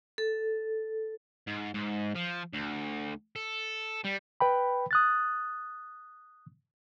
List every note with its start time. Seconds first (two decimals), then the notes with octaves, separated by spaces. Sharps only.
0.18 A4
1.47 G#2
1.74 G#2
2.15 F3
2.53 D2
3.36 A4
4.05 G3
4.40 B4 G5 B5
4.91 D#6 F#6 A6